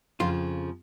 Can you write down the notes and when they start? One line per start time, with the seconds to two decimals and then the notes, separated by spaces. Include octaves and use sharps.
0.20 F2 C#3 F3 F4